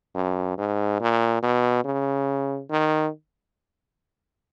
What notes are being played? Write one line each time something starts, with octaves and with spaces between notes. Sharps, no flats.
F#2
G#2
A#2
B2
C#3
D#3